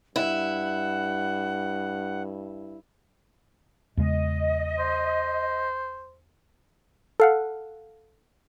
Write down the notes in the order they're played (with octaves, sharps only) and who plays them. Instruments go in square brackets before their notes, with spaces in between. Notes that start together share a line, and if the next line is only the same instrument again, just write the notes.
[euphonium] G2 [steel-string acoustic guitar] E4 [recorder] F#5
[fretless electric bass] E2 C#3 G#3 [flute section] D#5
[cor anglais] C5
[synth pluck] A4 F5 F#5